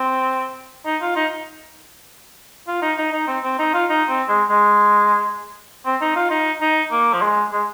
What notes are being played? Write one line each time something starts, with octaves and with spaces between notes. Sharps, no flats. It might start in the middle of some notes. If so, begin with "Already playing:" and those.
Already playing: C4
D#4
F4
D#4
F4
D#4
D#4
D#4
C4
C4
D#4
F4
D#4
C4
G#3
G#3
C4
D#4
F4
D#4
D#4
A#3
F3
G#3
G#3